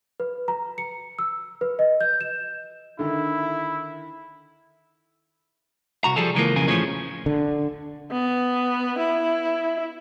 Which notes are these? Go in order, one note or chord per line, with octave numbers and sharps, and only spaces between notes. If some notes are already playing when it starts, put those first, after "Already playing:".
B4
A#5
C#7
E6
B4
D#5
G6
E7
D3 D#3 E4
C2 F#4 A#5
F3 G3 G#4 A4
C#2 E3 F3 A#3
B1 F2 C#3 F4 A#4 G#5
E2 A2 F3 C#4 G#4 C#5
D3
B3
E4